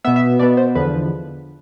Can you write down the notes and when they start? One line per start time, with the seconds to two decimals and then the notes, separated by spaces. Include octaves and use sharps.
0.04 B2 B3 E5
0.16 E5
0.39 B2 B3 D5
0.57 C5
0.75 E2 D3 F3 B4